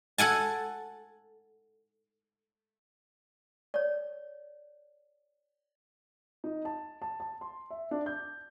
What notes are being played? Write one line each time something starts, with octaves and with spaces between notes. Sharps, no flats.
A4 F#5 G#5 A5
C#5 D5
D#4
A5
A5
A5
C6
E5
D4
G6